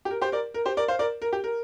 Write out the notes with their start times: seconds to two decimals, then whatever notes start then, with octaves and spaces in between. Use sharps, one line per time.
0.05 G4
0.11 A#4
0.21 G4 C5
0.32 A#4 D5
0.54 A#4
0.66 G4 C5
0.77 A#4 D5
0.88 C5 F5
0.99 A#4 D5
1.22 A#4
1.33 G4
1.44 A#4